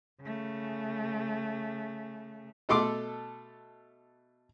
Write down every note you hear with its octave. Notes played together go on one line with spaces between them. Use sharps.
C#3 A3
B2 A3 A4 C6 D6